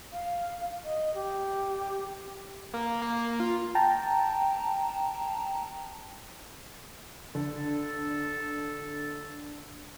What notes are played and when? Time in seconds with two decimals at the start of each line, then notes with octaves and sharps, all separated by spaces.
0.13 F5
0.84 D#5
1.14 G4
2.74 A#3
3.02 A#3
3.40 F4
3.75 G5 A5 A#5
7.35 D3 A4